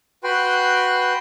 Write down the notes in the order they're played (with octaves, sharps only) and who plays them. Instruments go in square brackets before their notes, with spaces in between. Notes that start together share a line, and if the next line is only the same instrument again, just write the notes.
[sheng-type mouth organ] F#4 B4 G5 C6